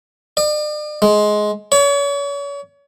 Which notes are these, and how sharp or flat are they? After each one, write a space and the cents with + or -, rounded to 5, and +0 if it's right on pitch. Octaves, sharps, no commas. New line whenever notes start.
D5 +45
G#3 +15
C#5 +35